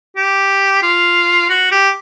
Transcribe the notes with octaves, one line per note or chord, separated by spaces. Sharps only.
G4
F4
F#4
G4